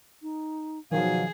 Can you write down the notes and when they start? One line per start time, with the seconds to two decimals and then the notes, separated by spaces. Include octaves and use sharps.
0.22 D#4
0.92 B2 D#3 F3 F#3 G#4 F5